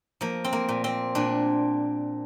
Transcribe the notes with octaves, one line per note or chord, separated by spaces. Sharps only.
F3 A#3
C4
A#3
A#2
C4
A#2 D4